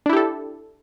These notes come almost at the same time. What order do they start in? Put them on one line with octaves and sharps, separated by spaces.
D4 E4 G4 A4